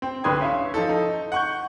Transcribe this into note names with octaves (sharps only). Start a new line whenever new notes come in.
C4
C2 D3 B4 C6 D#6 G#6
C#4 E5 F5
F3 D#4 A4
D#4
F#5 C#6 G6